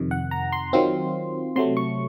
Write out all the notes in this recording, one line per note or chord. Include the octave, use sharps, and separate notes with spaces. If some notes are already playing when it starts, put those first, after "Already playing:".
Already playing: F2 C3 D#3
F#5
A#5
C6
D#3 F#3 C4 F4
C3 F#3 A3 C6
C#6